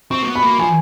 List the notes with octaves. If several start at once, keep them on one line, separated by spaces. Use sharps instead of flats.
C4 C#6
A#3
B3
B5
A#3
F3 G#5